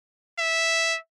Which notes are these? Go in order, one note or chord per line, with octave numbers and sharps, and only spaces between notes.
E5